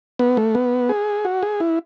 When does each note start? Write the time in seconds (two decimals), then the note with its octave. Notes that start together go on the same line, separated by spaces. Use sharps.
0.19 B3
0.37 A3
0.55 B3
0.89 G#4
1.25 F#4
1.43 G#4
1.60 E4